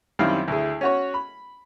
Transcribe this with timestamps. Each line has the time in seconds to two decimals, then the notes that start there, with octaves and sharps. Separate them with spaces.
0.19 F#2 D#3 G3 C4 E4 F5
0.48 D2 E4 G#4
0.81 C#4 F#4 C#5
1.14 B5